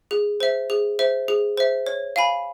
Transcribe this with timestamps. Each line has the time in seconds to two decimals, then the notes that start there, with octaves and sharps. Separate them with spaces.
0.11 G#4
0.40 C5 E5
0.70 G#4
0.99 C5 E5
1.28 G#4
1.57 C5 E5
1.86 C#5
2.16 F5 G#5 B5